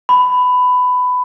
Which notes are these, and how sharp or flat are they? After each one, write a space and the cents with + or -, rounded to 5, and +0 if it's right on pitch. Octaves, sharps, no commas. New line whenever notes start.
B5 +15